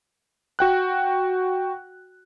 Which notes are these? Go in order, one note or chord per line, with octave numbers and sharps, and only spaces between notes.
F#4 G5 F#6